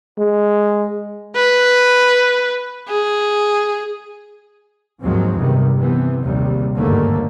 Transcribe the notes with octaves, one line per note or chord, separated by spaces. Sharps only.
G#3
B4
G#4
D#2 G#2 F3 F#3 G#3 C4
E2 G2 C3 D#3
C3 E3 B3
A#1 D#2 C3 G3
G1 D#2 G#2 D3 A3 A#3